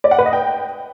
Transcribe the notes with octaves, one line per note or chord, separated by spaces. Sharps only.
D5
F#5
B4
D#5
G5